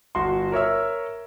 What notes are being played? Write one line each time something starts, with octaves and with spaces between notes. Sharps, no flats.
G1 F#4 C6
A#4 C#5 E5 E6